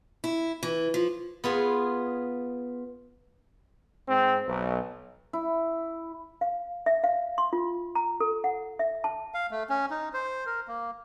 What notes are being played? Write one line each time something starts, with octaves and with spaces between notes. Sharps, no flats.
E4
E3
F3
B3 F4 G#4
G#2 C4
B1
E4
F5
E5
F5
C6
F4
A#5
A4
F#5
E5
A5
F5
A3
C#4
D#4
C5
A#4
A#3